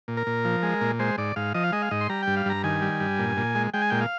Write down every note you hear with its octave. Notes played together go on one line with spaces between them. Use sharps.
A#2
A#4
A#2
F3
G#3
A#2
G#3 C5
G#2 D5
G#2 F5
F3 D#5
F5
G#3 D#5
F5
G#2 D#5
C6
G3 A#5
G2 G5
F5
G2 A#5
D#3 G#5
G3
G2
A#2
A#2
G#3
G#3 G5
G#5
A#2 G5
F5